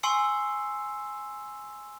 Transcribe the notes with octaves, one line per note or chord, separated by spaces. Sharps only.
G#5 C6 C#6 E6 C7 C#7